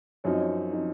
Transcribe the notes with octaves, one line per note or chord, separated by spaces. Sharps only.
F#2 F3 C4 D#4 C#5
D#5
C#5
F3 C4 D#4